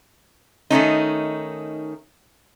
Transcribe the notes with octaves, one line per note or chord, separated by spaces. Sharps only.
D#3 A3 C#4 D#4